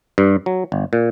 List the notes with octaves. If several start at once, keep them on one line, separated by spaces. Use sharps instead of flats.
G2
F#3
G1
A#2